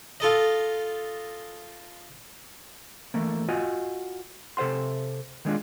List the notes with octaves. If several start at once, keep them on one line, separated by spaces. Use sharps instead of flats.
F4 A4 D#5
E3 A3 A#3
F4 F#4 D#5 G#5
C3 A4 C5 F#5 C6
D#3 G#3 D4 F4